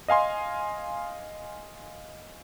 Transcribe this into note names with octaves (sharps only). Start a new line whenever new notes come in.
D#5 F5 G#5 C6